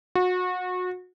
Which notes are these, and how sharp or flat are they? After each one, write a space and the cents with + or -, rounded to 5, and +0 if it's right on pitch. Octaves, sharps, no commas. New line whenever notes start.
F#4 -30